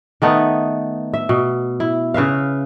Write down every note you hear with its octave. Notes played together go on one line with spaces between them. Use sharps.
D#3 A3 B3 D#4
E5
B2
E4
C#3 B4 E5 F5